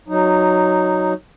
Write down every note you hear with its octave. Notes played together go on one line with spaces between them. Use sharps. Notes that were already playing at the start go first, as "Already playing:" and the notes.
F#3 D#4